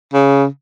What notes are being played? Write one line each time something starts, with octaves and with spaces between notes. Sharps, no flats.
C#3